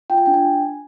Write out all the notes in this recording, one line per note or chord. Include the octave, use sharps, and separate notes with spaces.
F4 G5
G#5
D4 G5
G#5